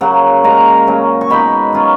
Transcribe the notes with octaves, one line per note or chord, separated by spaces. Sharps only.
C#3 F#3 A#3 F#5
A#2 G#3 C#4 F4 A#5
C#3 F#3 C#4
C#6
B2 G#3 D#4 B5
F#3 C#4 F4